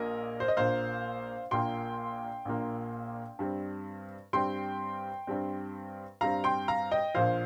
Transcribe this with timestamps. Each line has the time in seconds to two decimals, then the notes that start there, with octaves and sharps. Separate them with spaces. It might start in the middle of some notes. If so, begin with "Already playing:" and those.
Already playing: A#1 A#2 A#3 A#4 D#5
0.40 C5
0.48 D#5
0.57 A#1 A#2 A#3 C5 F5
1.51 A#1 A#2 A#3 G5 C6
2.45 A#1 A#2 A#3
3.39 G2 G3 C4
4.33 G2 G3 C4 G5 C6
5.27 G2 G3 C4
6.21 G2 G3 C4 F5 A#5
6.44 G5 C6
6.68 F5 A#5
6.91 D#5 G5
7.15 A#1 A#2 F3 C5 F5